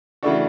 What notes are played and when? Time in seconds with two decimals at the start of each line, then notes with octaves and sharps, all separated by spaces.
0.23 C#3 E3 A3 D4 F#4